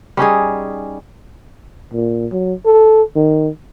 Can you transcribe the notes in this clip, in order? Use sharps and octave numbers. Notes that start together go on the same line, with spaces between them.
G3 C#4 D#4 G#4
A#2
F#3
A4
D#3